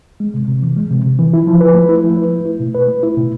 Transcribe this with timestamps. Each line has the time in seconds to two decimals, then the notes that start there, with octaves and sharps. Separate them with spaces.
0.20 G#3
0.34 C3
0.48 C3
0.62 E3
0.76 G#3
0.90 C3
1.05 C3
1.19 E3
1.33 E4
1.47 F3
1.61 B4
1.75 A3
1.89 E4
2.04 F3
2.17 B4
2.32 A3
2.45 E4
2.60 B2
2.75 B4
2.88 A3
3.03 E4
3.17 B2